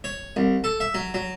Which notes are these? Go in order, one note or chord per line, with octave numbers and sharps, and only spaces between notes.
C#5
C2
A4
E5
F#3
F#3